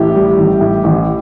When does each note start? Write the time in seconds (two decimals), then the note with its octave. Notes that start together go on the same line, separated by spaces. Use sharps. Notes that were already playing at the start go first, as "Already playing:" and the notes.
Already playing: A1 A2 G4
0.16 G3
0.38 A1
0.61 A2
0.84 A1